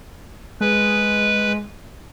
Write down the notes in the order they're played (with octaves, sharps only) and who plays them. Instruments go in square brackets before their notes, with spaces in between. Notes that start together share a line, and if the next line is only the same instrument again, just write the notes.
[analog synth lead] G#3 [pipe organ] B4